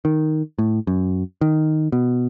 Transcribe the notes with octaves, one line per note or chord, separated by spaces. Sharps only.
D#3
A2
F#2
D#3
B2